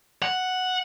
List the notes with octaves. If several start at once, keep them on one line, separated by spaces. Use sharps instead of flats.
F#5